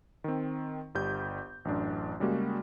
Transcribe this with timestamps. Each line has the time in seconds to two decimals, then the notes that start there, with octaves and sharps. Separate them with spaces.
0.24 D#3 C4
0.95 G1 G3 G6
1.65 A1 F#2 D4
2.20 C#3 G3 G#3 A#3 F#4